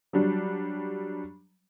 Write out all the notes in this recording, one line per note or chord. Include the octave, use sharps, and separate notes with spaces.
F#3 G3 D4